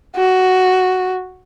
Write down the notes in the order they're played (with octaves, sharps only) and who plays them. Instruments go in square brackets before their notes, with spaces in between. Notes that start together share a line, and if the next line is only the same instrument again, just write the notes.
[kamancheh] F#4